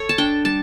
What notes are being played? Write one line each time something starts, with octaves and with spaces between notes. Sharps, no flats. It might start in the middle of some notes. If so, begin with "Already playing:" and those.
Already playing: A4 C#5
A5
D4 G5
G3 A5